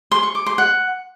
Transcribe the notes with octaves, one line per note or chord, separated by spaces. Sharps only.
C6
C#6
D6
C6
F#5